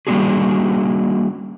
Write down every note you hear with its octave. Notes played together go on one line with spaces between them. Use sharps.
G3 A#3 C#4 D4 F#4 G#4